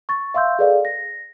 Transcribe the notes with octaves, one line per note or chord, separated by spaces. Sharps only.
C#6 A6
E5 F5 C6 E6 G6
G#4 A4 B4 D5 D#5 F5
A#6